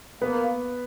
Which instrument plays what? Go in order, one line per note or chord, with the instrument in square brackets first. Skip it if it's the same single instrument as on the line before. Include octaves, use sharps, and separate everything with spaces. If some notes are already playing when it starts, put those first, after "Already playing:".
[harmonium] A#3 [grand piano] B3 B4